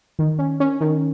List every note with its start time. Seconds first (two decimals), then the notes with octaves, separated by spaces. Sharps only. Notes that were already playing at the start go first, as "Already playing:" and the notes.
0.19 D#3
0.39 C#4
0.60 C#4
0.81 D#3